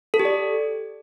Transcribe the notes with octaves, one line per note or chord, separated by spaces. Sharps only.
A4
G4
D5